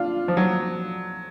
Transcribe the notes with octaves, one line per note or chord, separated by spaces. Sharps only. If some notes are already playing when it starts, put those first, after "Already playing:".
Already playing: D4 F4
F3
F#3